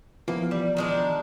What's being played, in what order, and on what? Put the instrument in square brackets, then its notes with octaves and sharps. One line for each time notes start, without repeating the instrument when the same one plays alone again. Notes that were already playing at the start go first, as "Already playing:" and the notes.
[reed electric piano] E3 F3 B3 [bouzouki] A#3
[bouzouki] G3
D#3 G#3 D4